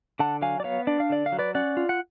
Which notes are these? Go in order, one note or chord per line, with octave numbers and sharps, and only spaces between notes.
D3 F#5 A5
F#3 F5 G#5
D5
B3 C#5 F5
D4 D5
F5
D3 D5
F5
F#3
B4 D5
C#4 D5 F#5
F4
F#5